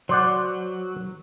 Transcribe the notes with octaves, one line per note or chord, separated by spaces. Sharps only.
F#3 C5 D5 F#5